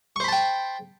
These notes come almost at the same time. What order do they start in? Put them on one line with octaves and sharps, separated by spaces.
C#6 C5 B5 A5 G5